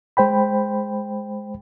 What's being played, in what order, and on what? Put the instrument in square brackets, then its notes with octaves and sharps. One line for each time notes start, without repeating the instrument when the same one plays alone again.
[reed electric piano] G#3 C5 G5 B5